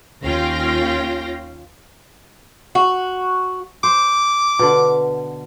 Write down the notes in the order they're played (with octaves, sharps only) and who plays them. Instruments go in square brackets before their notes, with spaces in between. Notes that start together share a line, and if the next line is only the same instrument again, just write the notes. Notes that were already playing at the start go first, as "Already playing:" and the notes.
[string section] D#2 C#4 F4 F5 G5 A#6
[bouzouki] F#4
[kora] C5 [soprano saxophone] D6
[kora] B2 D3